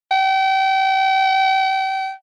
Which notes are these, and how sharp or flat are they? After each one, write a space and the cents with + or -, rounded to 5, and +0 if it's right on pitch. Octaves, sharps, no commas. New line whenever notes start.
G5 -35